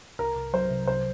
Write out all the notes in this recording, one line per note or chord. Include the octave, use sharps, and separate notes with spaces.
C2 A#4
C2
F#3 C5
C3
C2 C5